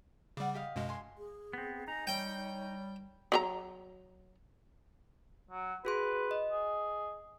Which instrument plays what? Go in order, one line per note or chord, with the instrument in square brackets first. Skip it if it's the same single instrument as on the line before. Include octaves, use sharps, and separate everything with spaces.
[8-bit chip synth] C#3 G3 [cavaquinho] F#5 D6
[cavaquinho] G4 D#5 F5
[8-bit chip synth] F#2 B2 G#3
[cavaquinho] G#5 C6
[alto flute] G#4
[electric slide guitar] B3 C4
[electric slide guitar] D#4 [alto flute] G#5 [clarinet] A#5
[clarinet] G3 [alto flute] C#5 [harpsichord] G5
[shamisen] F#3 F4 A#5
[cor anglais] F#3
[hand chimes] F#4 G#4 C6 [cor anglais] B4
[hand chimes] D#5
[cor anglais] G#4